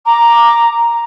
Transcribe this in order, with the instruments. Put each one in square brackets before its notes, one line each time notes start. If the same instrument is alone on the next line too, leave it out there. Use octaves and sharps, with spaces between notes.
[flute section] A#5 D6